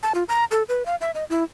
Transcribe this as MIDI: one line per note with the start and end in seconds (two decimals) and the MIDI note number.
0.03 0.12 81
0.15 0.23 65
0.29 0.45 82
0.51 0.63 69
0.69 0.85 71
0.86 0.95 77
1.01 1.11 76
1.15 1.24 75
1.30 1.44 64